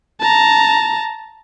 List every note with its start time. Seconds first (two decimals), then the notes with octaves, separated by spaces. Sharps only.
0.21 A5 A#5